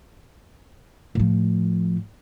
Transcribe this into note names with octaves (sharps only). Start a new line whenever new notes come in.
A2 F3